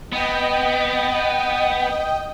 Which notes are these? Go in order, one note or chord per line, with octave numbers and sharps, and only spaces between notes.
B3 D#5 G5